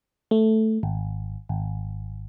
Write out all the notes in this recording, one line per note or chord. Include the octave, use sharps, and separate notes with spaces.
A3
G#1
G#1